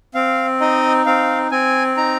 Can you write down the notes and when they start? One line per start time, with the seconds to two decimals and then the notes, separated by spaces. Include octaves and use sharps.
0.14 C4 F5
0.61 D#4 D#5
1.06 C4 F5
1.51 C4 G#5
1.97 D#4 A#5